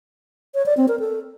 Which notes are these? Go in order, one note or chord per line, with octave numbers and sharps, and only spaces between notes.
C#5
D5
C4
A#4
A4